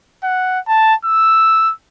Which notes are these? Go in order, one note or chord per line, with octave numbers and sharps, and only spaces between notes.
F#5
A5
E6